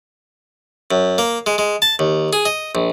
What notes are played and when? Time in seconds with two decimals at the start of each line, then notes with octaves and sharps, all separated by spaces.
0.91 F#2
1.18 A#3
1.46 G#3
1.58 G#3
1.82 A5
1.99 D#2
2.33 G#4
2.45 D#5
2.75 A#1